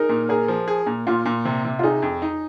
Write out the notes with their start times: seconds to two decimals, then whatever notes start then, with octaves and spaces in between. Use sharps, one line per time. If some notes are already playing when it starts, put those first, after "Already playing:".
Already playing: D#4 G#4 A#4
0.09 A#2
0.29 G#4 A#4
0.48 F3
0.68 G#4
0.86 A#2
1.07 A#2 F4
1.25 A#2
1.45 C3
1.64 C3
1.79 F4
1.83 D#4 G#4
2.02 F2
2.22 D#4